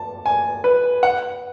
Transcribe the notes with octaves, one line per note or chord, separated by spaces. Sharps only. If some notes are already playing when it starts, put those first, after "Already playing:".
Already playing: A5
G#5
B4
F#5